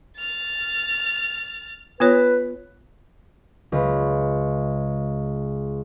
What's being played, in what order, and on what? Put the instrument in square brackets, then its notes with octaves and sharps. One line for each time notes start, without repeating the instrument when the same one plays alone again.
[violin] F6 A6
[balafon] B3 F4 C#5 [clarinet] B4
[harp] C#2 B4